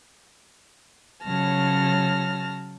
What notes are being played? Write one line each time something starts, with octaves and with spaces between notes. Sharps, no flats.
C#3 F#3 A5 F6 A#6